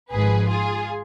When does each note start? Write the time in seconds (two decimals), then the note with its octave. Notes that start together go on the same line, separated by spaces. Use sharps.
0.12 G#1 G#2 F3 G#4 B4
0.49 F4 G#4